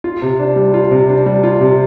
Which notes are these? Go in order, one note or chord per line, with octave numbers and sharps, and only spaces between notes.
F4
C3
D4
G3
F4
C3
D4
G3
F4
C3